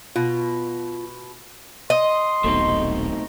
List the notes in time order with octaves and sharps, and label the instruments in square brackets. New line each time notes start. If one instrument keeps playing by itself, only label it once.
[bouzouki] B2 [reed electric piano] F4
[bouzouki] D#5 [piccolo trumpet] C6
[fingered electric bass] D#1 B1 B2 [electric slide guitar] A3 C4 D#4